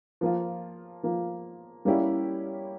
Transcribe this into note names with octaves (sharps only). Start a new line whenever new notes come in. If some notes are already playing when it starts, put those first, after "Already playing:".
F3 A#3 F4
F3 A#3 F4
G3 A#3 C#4 E4 G4